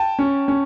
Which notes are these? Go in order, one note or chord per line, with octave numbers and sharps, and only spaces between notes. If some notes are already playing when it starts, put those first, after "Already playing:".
Already playing: G5 A5
C#4
C#4